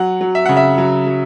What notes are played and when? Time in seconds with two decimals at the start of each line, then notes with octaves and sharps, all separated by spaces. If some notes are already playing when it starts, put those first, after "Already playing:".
Already playing: F#3 F#5
0.21 F#3
0.35 E5
0.46 C#3 F#5
0.57 E5
0.78 F#3
1.07 F#3